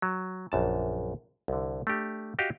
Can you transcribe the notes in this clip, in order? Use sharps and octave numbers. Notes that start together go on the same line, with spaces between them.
F#3
A#1 F#2 A5
C2 D3
A3 D4 G4
F#4 G4 D#5 F5